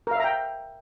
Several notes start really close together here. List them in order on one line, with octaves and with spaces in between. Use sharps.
A#4 F5 E5 A#5 G5